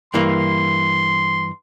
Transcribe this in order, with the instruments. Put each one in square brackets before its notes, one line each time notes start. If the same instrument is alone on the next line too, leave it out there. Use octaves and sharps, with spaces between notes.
[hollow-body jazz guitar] G2 E3 A#3 [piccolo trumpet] C6